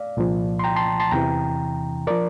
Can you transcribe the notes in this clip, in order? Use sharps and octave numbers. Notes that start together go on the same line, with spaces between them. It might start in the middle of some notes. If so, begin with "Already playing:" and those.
Already playing: D5 F5
C2 A#2 F3
C6
G5 A#5
A5 C6
A5 C6
E2 C3 E3 G5 A#5
F3 A#4 D5